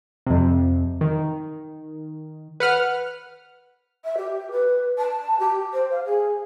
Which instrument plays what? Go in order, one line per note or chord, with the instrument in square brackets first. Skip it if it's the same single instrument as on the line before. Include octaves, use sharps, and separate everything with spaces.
[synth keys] F2 C3
D#3
B4 F#5 F6
[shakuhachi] E5
G4
B4
A5
G4
C5
F5
G#4